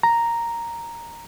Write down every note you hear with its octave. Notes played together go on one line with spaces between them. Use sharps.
A#5